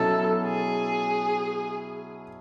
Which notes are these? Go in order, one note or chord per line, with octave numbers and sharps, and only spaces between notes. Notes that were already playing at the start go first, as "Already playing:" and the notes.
Already playing: B2 F#3 C#4 E4 A4
G#4